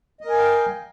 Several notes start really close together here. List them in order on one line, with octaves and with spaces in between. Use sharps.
D#5 A#4 G#5 F5 G5